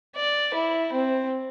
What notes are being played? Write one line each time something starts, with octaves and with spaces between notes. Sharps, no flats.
D5
E4
C4